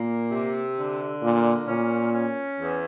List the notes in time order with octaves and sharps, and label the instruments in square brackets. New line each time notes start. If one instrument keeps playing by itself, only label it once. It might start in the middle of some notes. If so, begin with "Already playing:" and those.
Already playing: [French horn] A#2 [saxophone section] A#3
[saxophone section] C3
D3
[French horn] A#2 [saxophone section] A#3
[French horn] A#2 [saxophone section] C#4
[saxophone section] C#4
E2